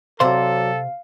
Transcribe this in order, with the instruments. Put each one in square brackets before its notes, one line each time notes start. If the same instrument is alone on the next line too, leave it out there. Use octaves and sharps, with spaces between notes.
[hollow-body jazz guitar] C3 C5 C6 [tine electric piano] F#3 D5 [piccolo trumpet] A4 [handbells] F5